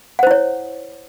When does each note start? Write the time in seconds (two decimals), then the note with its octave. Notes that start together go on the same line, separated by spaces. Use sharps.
0.19 F#5
0.23 C5
0.27 E4
0.31 C#5